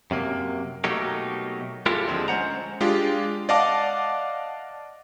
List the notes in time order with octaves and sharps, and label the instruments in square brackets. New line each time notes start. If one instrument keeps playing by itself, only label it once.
[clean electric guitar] F#2 C3 A#3
B2 F#3 A3 A#3 D#4 G4
G#3 E4 F4 G4 A4 A#4
D#2 D3 F3 G3 G#3 C4
G#3 C#4 C5 F#5 A#5
[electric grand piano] G#3 D4 F4 G4
D5 D#5 F5 F#5 A5 D6